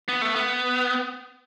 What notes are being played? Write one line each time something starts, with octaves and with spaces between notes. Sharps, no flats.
B3
A3
B3